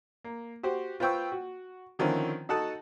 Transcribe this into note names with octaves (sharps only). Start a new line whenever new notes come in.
A#3
F#4 G4 C5
F4 B4 C5 G5 C#6 E6
F#4
D3 D#3 F3 C4 C#4 E4
D#4 F#4 A4 F#5 A5 D#6